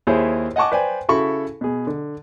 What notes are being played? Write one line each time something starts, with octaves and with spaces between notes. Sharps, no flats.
D#2 E4 G#4 C5 C#5
D#5 F#5 G#5 A5 C#6 D6
B4 C5 D5 G5 G#5
C#3 E4 F#4 A4 B5 C#6
B2 G#4
D3